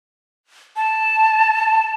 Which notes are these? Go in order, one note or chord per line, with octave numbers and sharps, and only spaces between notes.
A5